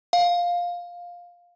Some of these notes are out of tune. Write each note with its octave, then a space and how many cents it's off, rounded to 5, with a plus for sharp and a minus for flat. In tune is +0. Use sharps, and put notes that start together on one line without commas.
F5 +10